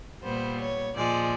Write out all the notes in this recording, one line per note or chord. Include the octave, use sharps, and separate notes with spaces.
A#2 G3 B3 C5
C#5
A#2 F3 G#3 D5